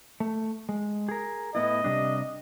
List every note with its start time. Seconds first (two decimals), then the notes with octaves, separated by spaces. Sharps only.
0.20 A3
0.69 G#3
1.09 G#4 A#4
1.55 A2 B3 E4 D#5
1.84 C3 G3 D4